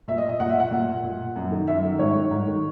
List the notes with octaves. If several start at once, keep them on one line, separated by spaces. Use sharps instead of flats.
A#2 E5
D#5
D#5
A#2 F#5
E5
F#5
A#2
A#2
F#2
D#3
F#2 E5
D#3
G#2 C#5
D#3
G#2
D#3